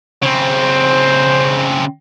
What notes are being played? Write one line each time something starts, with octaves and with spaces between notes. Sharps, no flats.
C#3 C4 C5